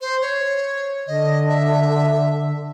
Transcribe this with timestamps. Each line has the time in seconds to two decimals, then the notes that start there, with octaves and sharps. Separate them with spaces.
0.01 C5
0.21 C#5
1.07 D3 D#5
1.49 E5